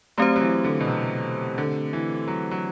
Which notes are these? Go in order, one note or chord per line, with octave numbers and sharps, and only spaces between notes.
F#3 A3 C4 G4 C5
F#3
E3
D3
B2
C3
D3
E3
F#3
F#3